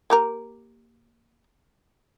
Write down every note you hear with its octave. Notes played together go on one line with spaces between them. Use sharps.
A#3 G4 A#4